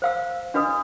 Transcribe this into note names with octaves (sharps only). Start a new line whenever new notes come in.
C5 F5 E6
D4 F#4 B4 D#5 D#6